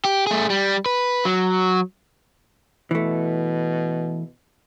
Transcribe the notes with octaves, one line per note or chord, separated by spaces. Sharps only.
G4
A3 G#4
G3
B4
F#3
B2 E3 A3